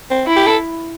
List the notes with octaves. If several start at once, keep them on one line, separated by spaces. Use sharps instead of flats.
C4
E4
G4
A4